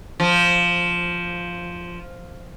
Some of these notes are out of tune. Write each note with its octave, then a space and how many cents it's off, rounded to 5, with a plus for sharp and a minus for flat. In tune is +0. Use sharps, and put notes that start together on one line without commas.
F3 +0